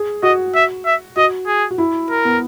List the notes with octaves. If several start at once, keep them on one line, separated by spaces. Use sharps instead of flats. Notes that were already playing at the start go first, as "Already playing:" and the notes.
Already playing: G#4
F#4 D#5
E5
E5
F#4 D#5
G#4
F#4
E4
A#4
B3